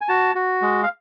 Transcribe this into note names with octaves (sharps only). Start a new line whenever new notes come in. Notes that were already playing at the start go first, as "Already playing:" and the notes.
G#5
F#4 A5
F#4
G#3
F5